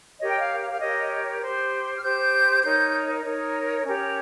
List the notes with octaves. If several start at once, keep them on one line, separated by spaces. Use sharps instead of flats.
G4 A#4 C#5 D#5
G5
F5
F5
F5
G4 A#4 C#5 D#5
G4 C5
F6
G4 C5 G6
D#4 A#4 C#5 G6
D#4 A#4 C#5
C#4 G4 A#4 C#5